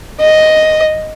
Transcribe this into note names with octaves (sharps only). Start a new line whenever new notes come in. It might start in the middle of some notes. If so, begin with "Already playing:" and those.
D#5